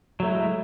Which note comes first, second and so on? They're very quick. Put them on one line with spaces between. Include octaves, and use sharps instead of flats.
F#3 A3 E4 G#3